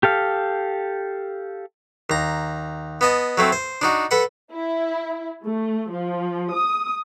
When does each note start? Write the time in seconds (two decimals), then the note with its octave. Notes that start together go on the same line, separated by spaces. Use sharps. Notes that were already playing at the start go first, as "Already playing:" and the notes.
0.03 G4 A4 F5
2.10 D#2 A#5
3.01 B3 D#5 A5
3.38 F#3 A3 C4
3.52 C5
3.82 D4 D#4 F#4
4.11 A4 B4 F#5
4.52 E4
5.45 A3
5.91 F3
6.54 D#6